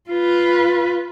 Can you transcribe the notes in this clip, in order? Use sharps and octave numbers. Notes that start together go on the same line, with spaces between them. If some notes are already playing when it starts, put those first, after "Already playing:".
F4 B4